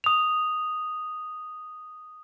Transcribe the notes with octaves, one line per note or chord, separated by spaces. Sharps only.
D#6 F7